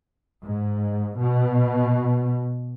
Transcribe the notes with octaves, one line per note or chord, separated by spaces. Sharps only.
G#2
B2